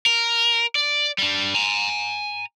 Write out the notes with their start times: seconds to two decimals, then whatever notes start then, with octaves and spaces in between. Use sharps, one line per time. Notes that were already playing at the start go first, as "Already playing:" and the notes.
0.06 A#4
0.75 D5
1.18 G3 D4
1.54 G#5 A#5